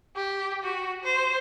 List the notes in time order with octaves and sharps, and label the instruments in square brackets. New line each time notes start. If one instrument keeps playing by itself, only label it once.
[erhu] G4
F#4
C5